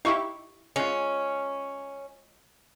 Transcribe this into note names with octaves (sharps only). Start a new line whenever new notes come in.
D#4 E4 G4 F5 C#6
G#3 C#4 F4